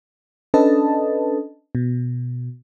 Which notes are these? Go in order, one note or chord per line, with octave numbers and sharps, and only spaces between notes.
C#4 D4 A4 B4 D#5 A5
B2